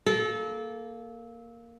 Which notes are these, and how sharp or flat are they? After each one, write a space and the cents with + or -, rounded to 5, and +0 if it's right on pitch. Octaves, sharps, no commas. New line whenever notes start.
A#3 +0 A4 -25